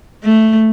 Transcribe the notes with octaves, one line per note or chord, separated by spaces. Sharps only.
A3